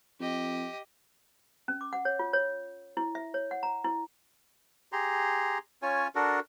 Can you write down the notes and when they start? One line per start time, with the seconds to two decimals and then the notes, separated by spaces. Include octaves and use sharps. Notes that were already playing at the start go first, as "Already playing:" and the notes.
0.20 F2 G4 D#5
1.68 C#4
1.81 D6
1.93 F#5
2.05 C#5
2.19 F4
2.33 C#5
2.97 E4
3.15 E5
3.34 C#5
3.51 F#5
3.63 A#5
3.84 E4
4.92 G4 G#4 A#5 C6
5.82 C#4 F4 C#5 G#5
6.15 D4 F#4 A4 A#4